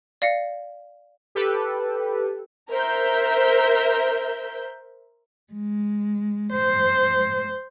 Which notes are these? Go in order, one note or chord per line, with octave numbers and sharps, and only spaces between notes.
D5 F5 A#6 C#7
G4 A4 B4
A#4 C5 E5 G6
G#3
C5